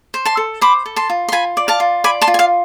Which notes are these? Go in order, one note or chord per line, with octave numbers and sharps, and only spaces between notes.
C5
A5 C6
A4
C5 B5 D6
A4
A5 C6
F4
C6
F4 G#5 B5
D5
F5 A5
F4
D5 G#5 B5
A5 C6
F4
G#5
F5